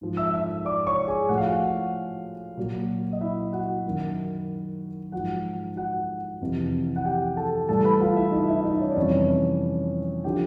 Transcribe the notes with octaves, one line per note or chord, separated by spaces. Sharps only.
G#2 F3
E5 E6
E5 E6
D5 D6
C#5 C#6
G#4 G#5
A2 F3 F#5
F5
F#4 F#5
A#2 F#3
D#5
E4 E5
F#4 F#5
F#2 D#3 F#3
G#2 F3 F#4 F#5
F#4 F#5
F2 C3 E3
F#5
G4 G5
A4 A5
A2 E3 G3 A4 A5
B4 B5
F4 F5
E4 E5
D#4 D#5
E4 E5
D#4 D#5
C#4 C#5
D5
F2 C3 E3 G3 C#4 C#5
D3 F3 G4 G5